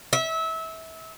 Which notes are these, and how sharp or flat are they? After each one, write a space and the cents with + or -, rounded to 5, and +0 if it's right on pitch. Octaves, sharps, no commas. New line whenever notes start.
E5 -25